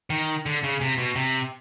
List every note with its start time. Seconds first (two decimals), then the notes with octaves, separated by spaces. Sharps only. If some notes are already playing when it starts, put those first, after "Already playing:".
0.10 D#3
0.46 D3
0.64 C#3
0.81 C3
0.98 B2
1.16 C3